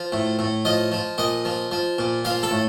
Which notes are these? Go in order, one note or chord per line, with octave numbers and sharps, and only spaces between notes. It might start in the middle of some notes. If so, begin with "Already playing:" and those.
Already playing: F3
A2
A2
F3 D#5
F3
A#2 D#5
F3
F3
A#2
F3 F5
A4
A2